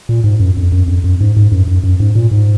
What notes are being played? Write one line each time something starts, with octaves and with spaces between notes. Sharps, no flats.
A#2
G#2
F#2
F2
F#2
F2
F#2
G#2
G#2
F#2
F#2
F#2
G#2
A#2
G#2